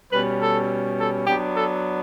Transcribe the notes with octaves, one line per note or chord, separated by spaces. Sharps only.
B2 G3 C#4 B4
A4
A4
F#3 B3 D4 G4
A4